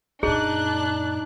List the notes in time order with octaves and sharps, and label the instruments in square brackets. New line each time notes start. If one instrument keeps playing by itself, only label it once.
[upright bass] F#2 A#2 [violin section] D4 F#6 [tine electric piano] D#4 [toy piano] G#4